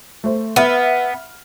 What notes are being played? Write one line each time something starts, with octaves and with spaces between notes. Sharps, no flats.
A3 C5
B3 E5 F6